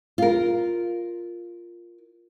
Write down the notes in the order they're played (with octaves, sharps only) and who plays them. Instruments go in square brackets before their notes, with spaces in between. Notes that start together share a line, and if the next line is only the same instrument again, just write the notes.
[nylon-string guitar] F4 A#4